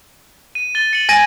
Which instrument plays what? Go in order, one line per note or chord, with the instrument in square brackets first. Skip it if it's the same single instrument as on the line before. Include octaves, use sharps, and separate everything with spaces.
[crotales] D#7
A6 G7
C#7 D#7 F#7
[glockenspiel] G#5 A#6 D#7 [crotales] G#6